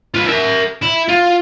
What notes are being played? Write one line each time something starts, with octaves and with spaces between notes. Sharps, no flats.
F4 B4
A#4 E5
E4
F4